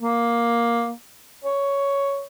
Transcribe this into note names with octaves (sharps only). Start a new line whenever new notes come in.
A#3
C#5